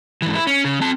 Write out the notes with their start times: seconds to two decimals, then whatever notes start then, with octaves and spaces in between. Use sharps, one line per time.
0.22 G#2 E3
0.35 E4
0.47 C#4
0.64 C#3
0.81 C4 A5